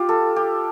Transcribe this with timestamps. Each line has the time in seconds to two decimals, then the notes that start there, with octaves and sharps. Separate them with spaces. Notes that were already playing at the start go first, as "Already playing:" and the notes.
Already playing: F4 G4
0.09 A4
0.36 G4